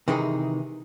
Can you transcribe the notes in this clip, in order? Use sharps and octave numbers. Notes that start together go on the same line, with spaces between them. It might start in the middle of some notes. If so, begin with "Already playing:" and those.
C3 D#3 E3 D#4 G#4